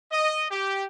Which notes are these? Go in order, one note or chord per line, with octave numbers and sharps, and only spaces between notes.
D#5
G4